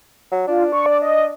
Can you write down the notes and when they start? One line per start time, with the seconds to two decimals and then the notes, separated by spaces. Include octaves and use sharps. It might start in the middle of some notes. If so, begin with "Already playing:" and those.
0.32 F#3
0.47 D4 F4
0.72 C#6
0.86 D5
1.02 D#5